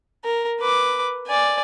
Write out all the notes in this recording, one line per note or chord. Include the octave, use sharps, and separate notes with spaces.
A#4
B4 D6
D5 G#5